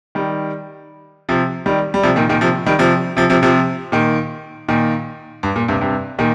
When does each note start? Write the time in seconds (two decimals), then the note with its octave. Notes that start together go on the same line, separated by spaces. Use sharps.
0.15 D#3 G3
1.29 C3 F3
1.66 D#3 G3
1.94 G3
2.03 C3 F3
2.16 A#2 D#3
2.29 A#2 D#3
2.41 C3 F3
2.66 D#3 G3
2.79 C3 F3
3.17 C3 F3
3.30 C3 F3
3.43 C3 F3
3.92 A#2 D#3
4.69 A#2 D#3
5.43 G2
5.56 A#2
5.68 G2 C3
5.81 G2 C3
6.19 A#2 D#3